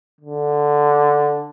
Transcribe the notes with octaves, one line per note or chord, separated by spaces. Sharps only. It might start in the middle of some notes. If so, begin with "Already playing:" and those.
D3